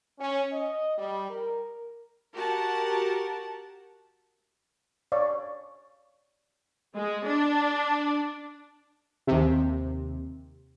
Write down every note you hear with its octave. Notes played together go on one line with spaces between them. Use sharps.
C#4
D#5
G3
A#4
F#4 G4 A#4 F#5 A5
C#5 D5 F5 C#6
G#3
D4
D#2 C3